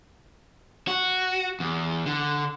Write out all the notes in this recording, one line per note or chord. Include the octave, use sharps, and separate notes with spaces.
F#4
E2
D3